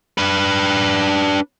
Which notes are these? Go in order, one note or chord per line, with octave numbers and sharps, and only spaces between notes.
D4 B4